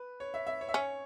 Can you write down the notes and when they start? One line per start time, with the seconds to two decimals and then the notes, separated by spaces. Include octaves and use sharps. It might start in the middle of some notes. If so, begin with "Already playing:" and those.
Already playing: B4
0.20 C#5
0.34 E5
0.47 E5
0.61 C#5
0.69 E5
0.74 C#4 C#5